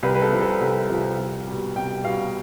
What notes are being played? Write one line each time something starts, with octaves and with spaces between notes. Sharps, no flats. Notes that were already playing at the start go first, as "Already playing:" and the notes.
C2 B4
B4
A4
C3 F3
A4
C2
C3 F3
C2
B2 G3
C2 G5
B2 G3 F5